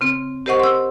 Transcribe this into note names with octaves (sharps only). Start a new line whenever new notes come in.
C#3 C4
G4 A#4 C5 D#5 F#5 C#6
C6 E6